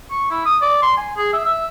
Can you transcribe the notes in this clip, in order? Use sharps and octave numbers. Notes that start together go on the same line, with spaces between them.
C#6
E4
D#6
D5
C6
G#5
G#4
E5
E5